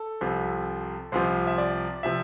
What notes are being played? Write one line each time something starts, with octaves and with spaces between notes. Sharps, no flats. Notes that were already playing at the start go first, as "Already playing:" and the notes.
Already playing: A4
C2 C3 F3
C2 C3 F3 C5
E5
D5
C3 F3 E5